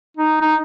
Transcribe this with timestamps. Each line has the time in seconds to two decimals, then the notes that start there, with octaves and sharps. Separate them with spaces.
0.17 D#4
0.41 D#4